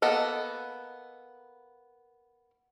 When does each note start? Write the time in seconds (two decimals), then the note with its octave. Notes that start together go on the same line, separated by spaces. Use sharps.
0.02 A#3 B3 A4 D#5